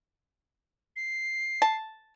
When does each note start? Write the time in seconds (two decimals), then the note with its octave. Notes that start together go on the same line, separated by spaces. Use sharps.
0.96 C7
1.62 A5